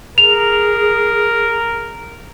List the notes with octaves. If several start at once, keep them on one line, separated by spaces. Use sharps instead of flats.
G#4 A#4 F7